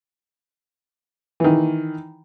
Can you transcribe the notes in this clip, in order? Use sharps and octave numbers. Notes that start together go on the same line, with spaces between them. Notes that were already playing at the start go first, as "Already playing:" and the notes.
D#3 E3